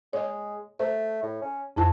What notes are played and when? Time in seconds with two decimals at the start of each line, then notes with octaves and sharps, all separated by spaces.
0.13 G#3 C#5 D#5
0.79 A3 C5
1.23 A2
1.42 C#4
1.76 F2 G#2 E4 A5